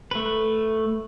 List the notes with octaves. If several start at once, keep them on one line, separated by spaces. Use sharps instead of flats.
A3 B4